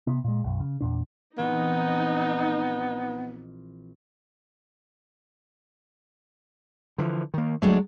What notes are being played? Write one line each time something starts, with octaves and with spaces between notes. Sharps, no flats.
C3 B3
A#2 G#3
B1 F#2
C#3
E2 A#2 D4
A#1 E3 B3 C4 D#4
D3 E3 F3
D#3 A#3
D2 F#3 G#3 A3 D4